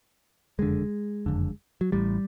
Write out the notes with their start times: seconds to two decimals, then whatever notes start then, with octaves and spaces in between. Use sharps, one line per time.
0.59 F#1 F2 D3 G#3
1.26 F#1 F2 D3
1.81 F#3
1.92 A1 A2 G3